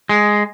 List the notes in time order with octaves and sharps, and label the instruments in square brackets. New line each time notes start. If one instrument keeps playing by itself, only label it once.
[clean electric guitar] G#3